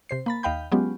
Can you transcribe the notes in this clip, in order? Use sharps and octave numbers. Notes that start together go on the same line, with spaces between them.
C3 C5 C7
A#3 B5 A6
D#2 D#5 F5 G5 B5 G6
F#3 G#3 B3 C#4 F4 G4